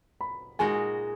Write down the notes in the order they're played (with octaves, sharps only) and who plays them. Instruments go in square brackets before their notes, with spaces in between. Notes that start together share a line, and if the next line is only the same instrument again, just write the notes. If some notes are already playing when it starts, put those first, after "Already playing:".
[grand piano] B5
[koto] A#2 G#3 D#4 F#4 [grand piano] G#5